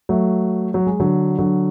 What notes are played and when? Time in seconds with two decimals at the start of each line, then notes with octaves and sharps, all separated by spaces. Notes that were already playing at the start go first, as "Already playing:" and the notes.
0.09 F#3 A3
0.74 F#3
0.86 G#3
1.00 D3 F#3
1.38 D3 F#3